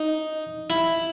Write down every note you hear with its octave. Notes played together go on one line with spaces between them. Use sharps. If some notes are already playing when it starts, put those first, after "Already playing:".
Already playing: D#4
E4